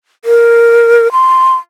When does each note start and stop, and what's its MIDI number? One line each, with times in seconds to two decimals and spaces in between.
0.25 1.11 70
1.12 1.54 84